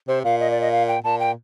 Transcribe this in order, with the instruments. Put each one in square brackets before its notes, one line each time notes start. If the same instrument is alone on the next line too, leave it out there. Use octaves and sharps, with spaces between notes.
[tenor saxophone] C3 [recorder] C5
[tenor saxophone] A#2 [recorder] F5
[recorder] D#5
D5
D#5
F5
G5
[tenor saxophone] A#2 [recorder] A5
[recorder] G5